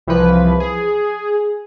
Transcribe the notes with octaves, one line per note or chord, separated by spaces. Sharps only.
C2 E3 F3 B4
G#4